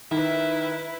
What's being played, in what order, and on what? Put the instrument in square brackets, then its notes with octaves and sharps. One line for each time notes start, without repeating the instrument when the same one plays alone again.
[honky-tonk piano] D#3 [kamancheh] E4 B4 [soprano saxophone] E5